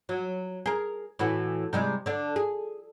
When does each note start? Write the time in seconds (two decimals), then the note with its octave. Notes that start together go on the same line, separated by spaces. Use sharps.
0.09 F#3
0.66 G#4 A#4
1.19 A2 E3 F#4
1.73 C3 G3 G#3
2.06 D3 D4
2.36 G#4